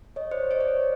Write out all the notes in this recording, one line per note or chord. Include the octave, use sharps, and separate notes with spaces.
C#5 D#5
C5 D5
C#5 D#5
C5 D5